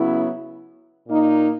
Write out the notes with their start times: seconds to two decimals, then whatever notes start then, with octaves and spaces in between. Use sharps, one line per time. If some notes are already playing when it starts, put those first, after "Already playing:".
Already playing: C#3 F#3 B3 E4
1.07 A#2 A#3 D#4